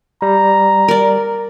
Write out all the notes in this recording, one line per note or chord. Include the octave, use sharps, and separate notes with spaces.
G3 A#5
A#4 D5